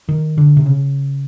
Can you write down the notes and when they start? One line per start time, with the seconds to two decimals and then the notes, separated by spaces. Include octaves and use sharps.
0.09 D#3
0.38 D3
0.57 C3
0.66 C#3